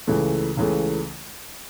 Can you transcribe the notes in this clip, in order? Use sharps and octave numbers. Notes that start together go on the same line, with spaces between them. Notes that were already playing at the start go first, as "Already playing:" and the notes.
C#2 C#3 E3 A3
C#2 C#3 E3 A3